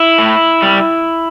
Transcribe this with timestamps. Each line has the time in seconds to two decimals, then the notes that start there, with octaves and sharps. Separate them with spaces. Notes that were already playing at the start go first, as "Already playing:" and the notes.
Already playing: E4
0.18 A2
0.62 G3